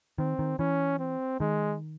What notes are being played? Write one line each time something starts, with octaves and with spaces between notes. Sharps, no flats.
D#3 C4
D#3
E3 C#4
C4
D#3 G#3